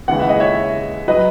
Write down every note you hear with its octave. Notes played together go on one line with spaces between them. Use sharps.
D#2 C#3 E3 G#3 F#5
E5
D#5
C#5 E5
F#3 B4 D#5